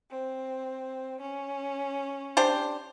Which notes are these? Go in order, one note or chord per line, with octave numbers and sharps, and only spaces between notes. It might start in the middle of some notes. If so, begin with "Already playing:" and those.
C4
C#4
D4 G4 C5